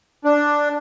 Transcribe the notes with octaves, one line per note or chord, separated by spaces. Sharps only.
D4